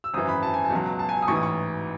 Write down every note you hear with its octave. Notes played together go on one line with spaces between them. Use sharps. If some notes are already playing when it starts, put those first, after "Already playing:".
E6
G#1 F#2 E3 D#6
B5
A5
G#5
A5
C#2 B2 F#3
A5
G#5
D#6
A1 G#2 E3 C#6
D#6
C#6